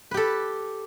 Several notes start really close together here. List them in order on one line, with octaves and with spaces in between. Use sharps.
B4 G4 A4